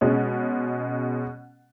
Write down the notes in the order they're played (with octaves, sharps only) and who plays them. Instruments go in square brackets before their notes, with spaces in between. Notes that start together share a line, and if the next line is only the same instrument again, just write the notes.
[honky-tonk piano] B2 G#3 C#4